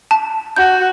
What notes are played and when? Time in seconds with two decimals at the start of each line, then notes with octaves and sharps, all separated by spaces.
0.11 A5
0.56 F#4 G6